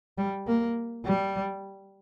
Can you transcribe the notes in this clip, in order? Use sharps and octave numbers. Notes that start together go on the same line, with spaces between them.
G3
A#3
G3